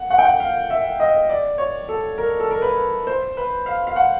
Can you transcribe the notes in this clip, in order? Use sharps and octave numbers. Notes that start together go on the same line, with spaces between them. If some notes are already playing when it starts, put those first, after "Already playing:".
Already playing: F#5
F#5
G5
F#5
F5
E5
D#5
D5
C#5
A4
A#4
A4
A#4
B4
C5
B4
F5
F5
F#5